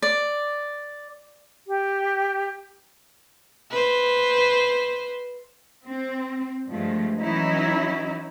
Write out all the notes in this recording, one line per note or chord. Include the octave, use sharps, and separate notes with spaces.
D5
G4
B4 C5
C4
G2 F3 G#3 A3
E3 F#3 C#4 D#4 E4